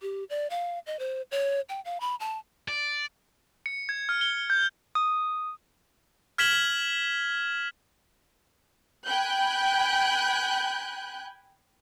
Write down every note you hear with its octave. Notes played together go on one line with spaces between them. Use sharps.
G4
D5
F5
D#5
C5
C#5
G5
F5
B5
A5
D5
C#7
G#6
F6
G7
G6
D#6
F6 G#6 B6 E7 F#7 G7
G5 G#5 B5 F#6 G6